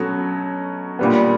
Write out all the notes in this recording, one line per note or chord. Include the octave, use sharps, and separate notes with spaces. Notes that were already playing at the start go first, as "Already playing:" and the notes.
Already playing: B2 F#3 A3 C#4
A#2 G3 B3